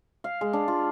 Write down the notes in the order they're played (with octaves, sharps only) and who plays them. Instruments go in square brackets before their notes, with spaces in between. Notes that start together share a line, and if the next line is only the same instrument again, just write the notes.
[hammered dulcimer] F5
G#3
D4
F4